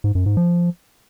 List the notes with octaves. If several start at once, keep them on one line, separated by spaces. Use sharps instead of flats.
G#2
F#2
G#2
F3